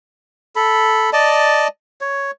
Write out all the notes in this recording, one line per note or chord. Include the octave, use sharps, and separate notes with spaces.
A4 B5
D5 D#5 A5
C#5